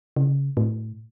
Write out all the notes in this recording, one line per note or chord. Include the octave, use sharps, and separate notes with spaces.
C#3
A2